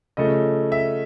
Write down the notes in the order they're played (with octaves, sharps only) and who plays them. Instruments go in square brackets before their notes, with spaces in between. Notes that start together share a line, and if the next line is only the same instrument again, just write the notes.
[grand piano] C#3 F3 A3 D#5
E5